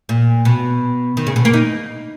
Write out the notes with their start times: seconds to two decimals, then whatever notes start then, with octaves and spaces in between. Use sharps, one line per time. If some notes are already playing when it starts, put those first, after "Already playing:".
0.09 A#2
0.45 B2
1.17 D#3
1.27 C#3
1.36 B2
1.45 A#3
1.53 D#4